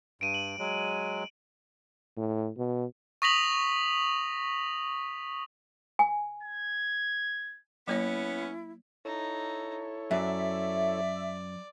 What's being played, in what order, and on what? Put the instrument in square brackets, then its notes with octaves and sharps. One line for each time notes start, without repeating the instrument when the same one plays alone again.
[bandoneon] G2 [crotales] D7 D#7
[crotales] F#7
[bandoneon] F#3 G#3
[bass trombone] A2
B2
[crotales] C#6 D#6 A#6 B6 F7 F#7
[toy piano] G#5
[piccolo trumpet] G#6
[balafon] F#3 A#3 C#5 [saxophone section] B3 C#4 [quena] E4
[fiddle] D#4 [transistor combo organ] E4 A4 C#5
[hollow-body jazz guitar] F#2 [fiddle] D5 [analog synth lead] E5